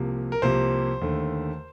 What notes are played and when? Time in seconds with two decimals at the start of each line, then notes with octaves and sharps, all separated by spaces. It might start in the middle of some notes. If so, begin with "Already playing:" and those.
Already playing: C2 C3 F3 A#3
0.32 A#4
0.42 C2 C3 F3 A#3 C5
1.02 D#2 D3 A3